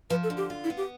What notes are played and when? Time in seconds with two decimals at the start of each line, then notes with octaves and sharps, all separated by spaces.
0.10 F3 B4
0.23 A4
0.30 D3
0.37 G4
0.50 F4
0.64 E4
0.70 B3
0.77 G4